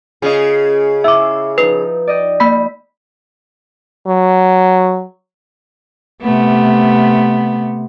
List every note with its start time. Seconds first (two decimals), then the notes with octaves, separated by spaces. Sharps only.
0.22 C#3 F4 G#4 D#5
1.04 E4 E5 D6 E6
1.58 F3 D#4 B4
2.07 D5 D#5 G5
2.40 A#3 B5 B6
4.07 F#3
6.22 C3 A3 B3